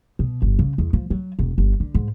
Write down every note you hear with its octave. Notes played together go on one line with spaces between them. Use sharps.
B2
G1
C#3
E2
F3
F#3
E1
G1
D3
G#2